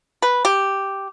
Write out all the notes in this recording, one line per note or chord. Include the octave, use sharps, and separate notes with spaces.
B4
G4